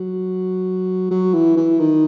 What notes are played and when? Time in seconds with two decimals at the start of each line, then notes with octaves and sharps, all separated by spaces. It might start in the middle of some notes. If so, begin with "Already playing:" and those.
Already playing: F#3
1.11 F#3
1.34 E3
1.57 E3
1.80 D#3